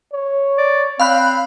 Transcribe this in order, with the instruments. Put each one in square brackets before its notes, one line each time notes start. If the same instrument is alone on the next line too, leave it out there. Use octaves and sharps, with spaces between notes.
[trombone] C#5
[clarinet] D5
[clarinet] C4 [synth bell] F5 B5 F#6